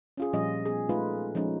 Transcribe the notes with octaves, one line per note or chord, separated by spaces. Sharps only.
C#4 F4 G#4
A#2 F3 G3 C#4 D#5
B3 G#4
G#3 A3 D#4 F4 B4
F3 G#3 C#4 D#4